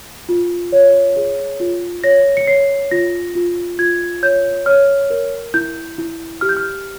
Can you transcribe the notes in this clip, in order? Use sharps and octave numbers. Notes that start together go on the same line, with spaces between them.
F4
C#5
G#4
F4
C#5 A#6
C#7
C#5 C7
F4 A#6
F4
F4 G#6
C#5 G6
C#5 F6
A#4
E4 G6
E4
G4 F6
G6
F6